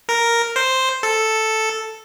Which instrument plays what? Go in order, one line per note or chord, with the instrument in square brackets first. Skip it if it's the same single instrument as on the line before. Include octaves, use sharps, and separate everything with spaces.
[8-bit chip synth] A#4
C5
A4